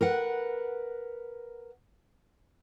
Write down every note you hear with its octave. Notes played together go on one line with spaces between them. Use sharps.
A#4 B4 F#5